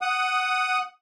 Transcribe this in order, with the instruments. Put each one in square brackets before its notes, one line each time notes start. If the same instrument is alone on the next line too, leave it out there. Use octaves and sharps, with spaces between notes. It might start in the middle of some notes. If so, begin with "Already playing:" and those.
[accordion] F#5 D#6